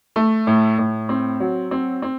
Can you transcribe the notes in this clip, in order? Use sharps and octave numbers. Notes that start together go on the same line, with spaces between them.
A3
A2
A2
C4
F#3
C4
C4